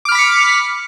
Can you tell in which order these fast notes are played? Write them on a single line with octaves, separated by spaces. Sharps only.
D6 F6 B5 B6 C#7